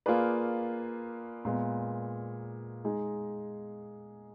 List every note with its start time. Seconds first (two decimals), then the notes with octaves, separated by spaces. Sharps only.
0.06 A#3 F4 G#4 B4 D5
1.45 A#2 G#3 B3
2.84 G#3 D#4 G#4